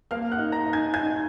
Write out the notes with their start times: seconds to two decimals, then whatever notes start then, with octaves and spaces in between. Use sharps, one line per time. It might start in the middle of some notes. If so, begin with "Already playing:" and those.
0.11 A#3 F5 F6
0.32 F#5 F#6
0.38 D#4
0.52 A#5 A#6
0.66 D#4
0.73 G#5 G#6
0.94 D#4 G#5 G#6